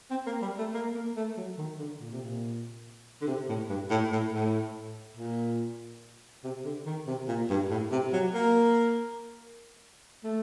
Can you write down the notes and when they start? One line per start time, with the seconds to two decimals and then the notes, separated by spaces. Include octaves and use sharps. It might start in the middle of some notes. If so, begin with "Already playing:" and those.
0.11 C4
0.26 A#3
0.42 G3
0.58 A3
0.74 A#3
0.95 A#3
1.16 A3
1.37 F#3
1.58 D#3
1.79 D3
2.01 A#2
2.12 C3
2.23 A#2
3.22 D3
3.27 C3
3.49 A2
3.69 G2
3.90 A2
4.12 A2
4.33 A2
5.17 A#2
6.44 C3
6.65 D3
6.86 D#3
7.07 C3
7.28 A#2
7.50 G2
7.71 A2
7.92 C3
8.13 F#3
8.34 A#3
10.24 A3